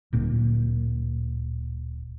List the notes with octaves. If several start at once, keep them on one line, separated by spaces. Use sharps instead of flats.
D1 A#2